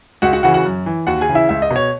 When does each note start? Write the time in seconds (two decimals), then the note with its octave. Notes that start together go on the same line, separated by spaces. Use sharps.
0.22 C#2 F#4 F#5
0.33 F#4 F#5
0.43 C#3 E3 F#4 F#5
0.54 F#4 F#5
0.65 F#2
0.86 E3
1.07 D#2 F#4 F#5
1.21 G#4 G#5
1.29 C#3 E3
1.35 E4 E5
1.49 C#2 E5
1.62 D#5
1.71 B2
1.76 C#5